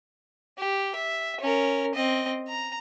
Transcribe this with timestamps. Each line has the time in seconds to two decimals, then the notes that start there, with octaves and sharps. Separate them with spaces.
0.58 G4
0.95 E5
1.41 C#4 A#4
1.95 C4 D#5
2.48 A#5